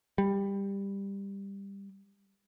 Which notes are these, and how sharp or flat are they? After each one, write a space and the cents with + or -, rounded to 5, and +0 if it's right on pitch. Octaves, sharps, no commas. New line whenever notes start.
G3 +15